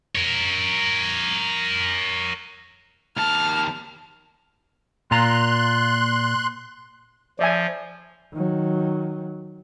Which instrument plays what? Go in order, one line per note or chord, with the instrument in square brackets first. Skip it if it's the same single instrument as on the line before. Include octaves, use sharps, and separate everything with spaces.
[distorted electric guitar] A#4 C#5
[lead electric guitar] D#2 A5 [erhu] F6
[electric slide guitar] A#2 F4 A#5 [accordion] C6 F#6
[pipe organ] F3 [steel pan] D5 E5 G#5
[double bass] D#3 F#3